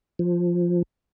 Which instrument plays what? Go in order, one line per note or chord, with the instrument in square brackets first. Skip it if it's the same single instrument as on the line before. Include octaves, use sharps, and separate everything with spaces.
[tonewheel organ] F3